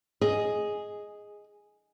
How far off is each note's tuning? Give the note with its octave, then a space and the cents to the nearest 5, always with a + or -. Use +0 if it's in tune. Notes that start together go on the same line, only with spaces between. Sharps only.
G#4 +0 D#5 +0